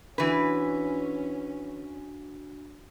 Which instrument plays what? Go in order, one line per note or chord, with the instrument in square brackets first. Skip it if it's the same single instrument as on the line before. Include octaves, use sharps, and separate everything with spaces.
[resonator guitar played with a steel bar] E3 B4 [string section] C#4 [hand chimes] D4 F#4 B6